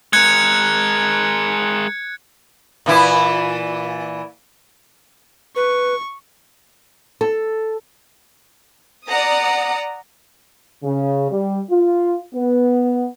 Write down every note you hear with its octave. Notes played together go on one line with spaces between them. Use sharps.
G#3 A#4 F#6 G#6 C#7
A#2 E3 E4
B4 C#6
A4
D5 F#5 A#5 D#6
C#3
G3
F4
B3